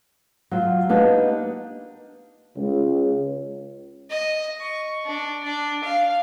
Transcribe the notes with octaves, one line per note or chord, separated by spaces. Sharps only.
F#3 F4
A#3 B3 D4 D#4 G4
C#2
D#5
C#6
D4
D4
F5